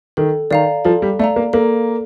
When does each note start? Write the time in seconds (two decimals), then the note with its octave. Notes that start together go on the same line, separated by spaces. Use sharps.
0.17 D#3 A4
0.51 D#3 D5 F5 A#5
0.85 F3 A4
1.02 G3
1.19 A3 D5 F5 A#5
1.36 A#3
1.53 A#3 A4